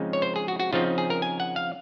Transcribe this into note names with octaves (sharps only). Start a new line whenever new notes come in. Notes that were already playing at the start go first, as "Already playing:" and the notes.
Already playing: C#3 F3 G#3 C4 D#4
C#5
C5
G#4
F#4
F#4
C#3 F3 C4 D#4 F4
G#4
A#4
G#5
F#5
F5